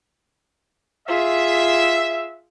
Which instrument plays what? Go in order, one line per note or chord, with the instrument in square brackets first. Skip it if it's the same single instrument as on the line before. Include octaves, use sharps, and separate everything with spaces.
[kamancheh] F4 G#4 [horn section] E5